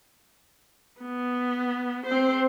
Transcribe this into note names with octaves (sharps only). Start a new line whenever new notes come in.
B3
C4 C5